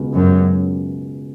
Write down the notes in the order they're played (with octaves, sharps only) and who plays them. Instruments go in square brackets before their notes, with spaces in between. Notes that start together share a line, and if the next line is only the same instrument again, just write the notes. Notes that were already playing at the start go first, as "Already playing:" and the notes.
Already playing: [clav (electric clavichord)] C#2 B2
[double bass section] F#2